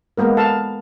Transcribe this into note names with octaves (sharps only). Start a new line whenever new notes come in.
G#3 A#3 B3 A#4
A4 F5 A5